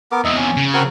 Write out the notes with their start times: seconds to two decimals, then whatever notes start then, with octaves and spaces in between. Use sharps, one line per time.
0.12 B3 A#4 D6
0.25 E2 C3 D#5 E5
0.37 C#4
0.57 C#3
0.74 C4 F#4 A#4